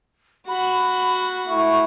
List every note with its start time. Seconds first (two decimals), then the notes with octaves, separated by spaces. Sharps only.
0.48 F#4 F#5 B5
1.48 A3 E4 C#6